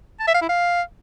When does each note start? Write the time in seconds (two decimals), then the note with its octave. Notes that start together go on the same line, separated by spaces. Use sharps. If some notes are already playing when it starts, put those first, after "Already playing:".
0.20 A5
0.27 E5
0.34 F5
0.41 E4
0.49 F5